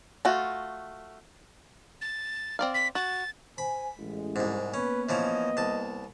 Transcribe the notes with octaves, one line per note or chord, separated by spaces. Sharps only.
A3 F4 F#4
A6
C4 D5 F5
B6
F#4 A6
C5 G#5 B5
A1 G#3
C2 G#2
A#3 B3 C#4 B4
E3 F3 C#4 D#5
C2 A5